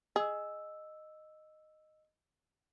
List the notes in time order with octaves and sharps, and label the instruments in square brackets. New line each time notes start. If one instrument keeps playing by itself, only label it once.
[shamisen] G#4 [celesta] D#5 E6